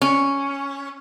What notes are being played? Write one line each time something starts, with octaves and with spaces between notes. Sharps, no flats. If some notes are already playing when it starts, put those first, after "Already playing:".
C#4